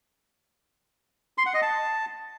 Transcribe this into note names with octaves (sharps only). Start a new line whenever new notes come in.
C6
F#5
D#5
A5